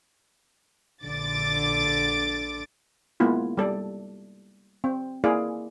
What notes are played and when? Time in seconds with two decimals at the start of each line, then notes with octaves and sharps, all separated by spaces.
1.04 A#1 D3 D6 A6
3.20 G#3 A#3 B3 E4 F4
3.57 G3 A4 D5
4.84 C4
5.24 A#3 E4 G#4 D5 F5